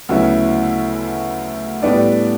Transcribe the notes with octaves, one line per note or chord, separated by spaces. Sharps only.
D2 C#3 F#3 B3 E4
A2 G3 B3 D4